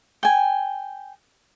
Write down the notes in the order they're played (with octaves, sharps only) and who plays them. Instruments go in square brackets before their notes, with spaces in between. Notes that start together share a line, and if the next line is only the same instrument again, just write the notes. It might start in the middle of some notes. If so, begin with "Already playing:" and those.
[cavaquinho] G5 G#5